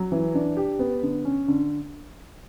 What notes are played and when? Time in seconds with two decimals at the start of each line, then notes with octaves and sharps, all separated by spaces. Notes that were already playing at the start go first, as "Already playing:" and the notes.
Already playing: F#3
0.12 E3
0.34 D4
0.57 G4
0.79 B3
1.03 D3
1.25 C#4
1.48 D3